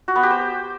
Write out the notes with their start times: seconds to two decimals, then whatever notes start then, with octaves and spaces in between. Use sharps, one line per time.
0.08 F#4
0.16 B3
0.23 G4
0.31 C5